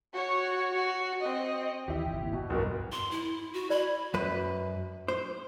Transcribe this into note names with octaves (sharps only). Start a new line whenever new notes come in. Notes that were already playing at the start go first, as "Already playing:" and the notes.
F#4 C#5
F#4
C4 D#5
D#2 E3 E4 G4
G1 C3
G1 D#3 A#3
G#2 B2
B1 E2 G2 B3 F#4 A#4
C6
E4
F#4
D5 B5
F#2 B4
C5